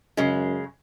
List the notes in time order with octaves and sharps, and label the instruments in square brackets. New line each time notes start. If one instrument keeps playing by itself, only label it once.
[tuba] F#2 [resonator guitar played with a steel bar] C#3 G#3